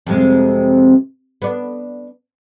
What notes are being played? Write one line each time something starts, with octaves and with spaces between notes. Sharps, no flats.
F2 C3 G#3
B3 D4